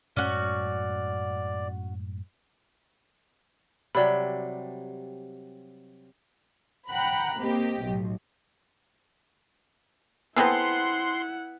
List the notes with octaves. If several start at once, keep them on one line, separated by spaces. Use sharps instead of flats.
F#2 A2 G#3 C#4 F#4 D5
C3 F#3 G3 D5 B5
F#5 G5 A#5 B5 F#6
A#3 C4 G4 D#5
B1 A2
B3 C4 E4 G#4 A4 B4 F#5 C6